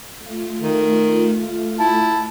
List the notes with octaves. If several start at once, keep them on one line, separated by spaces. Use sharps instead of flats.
A3 F4
D#3
E4 A5